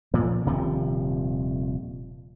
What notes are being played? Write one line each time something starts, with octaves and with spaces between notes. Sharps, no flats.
A#2 F3
D#1 C3 D#3 F3